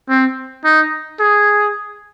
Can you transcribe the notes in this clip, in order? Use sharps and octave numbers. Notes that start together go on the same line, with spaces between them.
C4
D#4
G#4